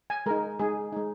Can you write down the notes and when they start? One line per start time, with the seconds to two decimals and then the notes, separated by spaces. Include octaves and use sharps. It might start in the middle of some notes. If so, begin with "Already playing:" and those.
0.10 G#5
0.26 G#3 D#4 A#4
0.59 G#3 D#4 G#4
0.93 G#3 D#4